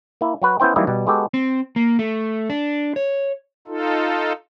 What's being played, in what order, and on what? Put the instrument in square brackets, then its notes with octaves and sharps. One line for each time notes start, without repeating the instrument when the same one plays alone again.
[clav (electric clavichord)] A#3 E4
F#3 F#4 B4
B3 C#4 E4 C5 G5
E3 F#3 G3 A#3 D#4 E4
B2 G3
G#3 B3 F#4 G4 A4
[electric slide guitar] C4
A#3
A3
D4
C#5
[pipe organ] D#4 F4 A4